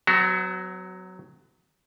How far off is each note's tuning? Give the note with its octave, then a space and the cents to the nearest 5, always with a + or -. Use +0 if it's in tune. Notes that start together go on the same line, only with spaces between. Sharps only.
F#3 +0 B3 +45 F#4 +15